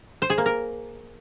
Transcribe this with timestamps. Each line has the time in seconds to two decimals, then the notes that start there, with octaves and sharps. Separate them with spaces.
0.22 C5
0.30 G#4
0.38 A#3
0.46 A#4